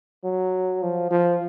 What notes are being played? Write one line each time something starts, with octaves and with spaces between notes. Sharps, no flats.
F#3
F3
F3